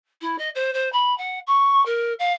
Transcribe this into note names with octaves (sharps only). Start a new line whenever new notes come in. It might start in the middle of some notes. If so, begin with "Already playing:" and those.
E4
D#5
C5
C5
B5
F#5
C#6
A#4
F5